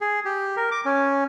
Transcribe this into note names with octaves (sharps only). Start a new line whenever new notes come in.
G#4
G4
A#4
D6
C#4